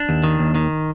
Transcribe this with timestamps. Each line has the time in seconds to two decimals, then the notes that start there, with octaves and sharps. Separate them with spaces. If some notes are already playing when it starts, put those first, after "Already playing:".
Already playing: D4
0.09 D#2
0.24 D#3
0.39 D#2
0.55 D#3